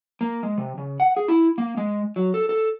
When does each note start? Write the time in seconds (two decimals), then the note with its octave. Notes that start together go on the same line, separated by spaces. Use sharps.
0.21 A#3
0.43 G#3
0.57 C3
0.78 C#3
1.00 F#5
1.17 G#4
1.28 E4
1.58 A#3
1.77 G#3
2.16 F#3
2.34 A4
2.49 A4